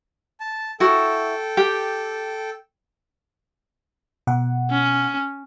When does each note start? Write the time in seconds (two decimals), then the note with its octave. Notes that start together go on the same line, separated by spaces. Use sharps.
0.40 A5
0.80 E4 F#4 A4 G5
1.57 G4
4.27 B2 F#5
4.70 C#4